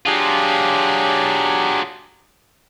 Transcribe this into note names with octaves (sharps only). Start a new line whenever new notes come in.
F#3 D4 F4 G4 G#4